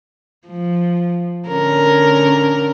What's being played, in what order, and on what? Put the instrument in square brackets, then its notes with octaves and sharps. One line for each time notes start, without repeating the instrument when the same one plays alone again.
[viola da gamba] F3
D3 C#4 A#4